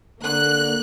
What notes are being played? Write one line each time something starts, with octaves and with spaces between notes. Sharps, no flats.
D3 A#3 F#6